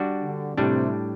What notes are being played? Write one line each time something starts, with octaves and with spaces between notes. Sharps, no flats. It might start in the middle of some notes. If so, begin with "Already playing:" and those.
Already playing: G3 D4 F#4
D3
A2 C3 G3 D4